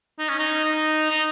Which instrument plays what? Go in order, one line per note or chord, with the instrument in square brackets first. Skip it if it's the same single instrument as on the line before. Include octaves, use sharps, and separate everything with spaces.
[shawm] D#4
C#4
D#4
D#4
D#4